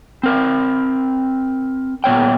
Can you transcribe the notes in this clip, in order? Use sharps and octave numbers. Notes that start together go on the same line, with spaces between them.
C4 A#4
A#2 B3 C#5 G5